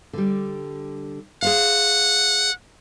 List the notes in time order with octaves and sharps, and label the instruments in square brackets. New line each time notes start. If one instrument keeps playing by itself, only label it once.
[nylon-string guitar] D3 G3
[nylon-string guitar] G#4 C5 F5 [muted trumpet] F#5